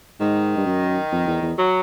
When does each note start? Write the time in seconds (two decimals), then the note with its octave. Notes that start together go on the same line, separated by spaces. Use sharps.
0.20 G#2 D#3
0.57 G2
0.66 F#2
1.12 F2
1.27 E2
1.42 E2
1.59 F#3